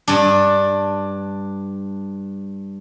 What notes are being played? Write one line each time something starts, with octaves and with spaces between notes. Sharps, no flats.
G2 D4